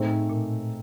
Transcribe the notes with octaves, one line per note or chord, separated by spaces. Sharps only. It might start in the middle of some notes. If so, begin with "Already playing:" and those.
Already playing: A2 A3 C4 D#4 G#4 C5
A#2